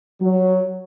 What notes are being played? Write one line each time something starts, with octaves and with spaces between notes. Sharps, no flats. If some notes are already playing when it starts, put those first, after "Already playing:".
F#3